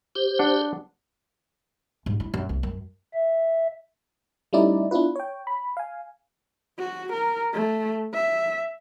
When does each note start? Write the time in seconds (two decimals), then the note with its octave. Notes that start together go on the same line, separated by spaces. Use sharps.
0.15 G4 C5
0.39 D4 F#5
2.06 G#2
2.20 E4
2.34 F#2
2.49 C2
2.63 F#2
3.14 E5
4.53 G3 A3 C#4 D#4 E4 D5
4.91 B3 D4 E4 F4 B4
5.15 C#5 G5
5.47 B5
5.77 F5 G#5
6.79 F#4
7.13 A#4
7.54 A3
8.14 E5